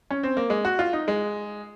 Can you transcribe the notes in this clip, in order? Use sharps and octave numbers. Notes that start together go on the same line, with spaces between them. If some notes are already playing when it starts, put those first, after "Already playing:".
C#4
C4
A#3
G#3
F#4
F4
D#4
G#3